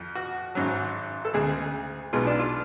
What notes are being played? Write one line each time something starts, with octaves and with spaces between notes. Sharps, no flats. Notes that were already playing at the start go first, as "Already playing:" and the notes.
Already playing: F2 F3
F#4
G#1 G#2 F#3
A4
D2 C#3 G#3 G#4
B1 B2 G#3 F4
D4
F4